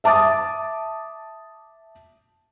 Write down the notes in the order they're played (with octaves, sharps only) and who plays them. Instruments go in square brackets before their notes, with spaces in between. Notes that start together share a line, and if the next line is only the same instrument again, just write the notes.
[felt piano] E5 A5 D6 D#6 A6